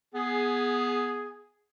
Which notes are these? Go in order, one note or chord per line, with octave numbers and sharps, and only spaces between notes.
B3 G#4